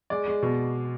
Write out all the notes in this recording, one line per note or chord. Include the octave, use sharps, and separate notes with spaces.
G#3 D5
G#3
B2